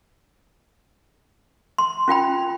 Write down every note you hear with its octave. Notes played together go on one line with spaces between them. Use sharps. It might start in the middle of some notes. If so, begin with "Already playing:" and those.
C6
C#4 F4 G5 B5